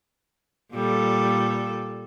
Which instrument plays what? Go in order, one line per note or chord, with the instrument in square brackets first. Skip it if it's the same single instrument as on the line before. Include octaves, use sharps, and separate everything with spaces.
[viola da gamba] A#2 G3 A4